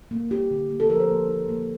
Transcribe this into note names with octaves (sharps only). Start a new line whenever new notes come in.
A#3
A#3 G4
D3
A#3
A4
F3 A#4
C5
A#3
D#4
A#3